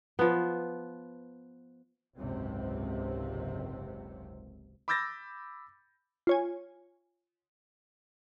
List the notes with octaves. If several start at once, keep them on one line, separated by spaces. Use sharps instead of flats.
F3 B3
F#1 C#2 G#2 C3 C4
B5 D6 E6 G6 A6 A#6
F4 C#5 G#5